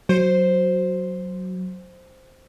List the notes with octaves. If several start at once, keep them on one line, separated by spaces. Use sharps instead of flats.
F#3 C5